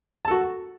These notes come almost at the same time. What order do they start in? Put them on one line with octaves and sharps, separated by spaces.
A5 A4 F#4